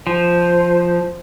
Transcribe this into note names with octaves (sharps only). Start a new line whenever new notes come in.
F3 C5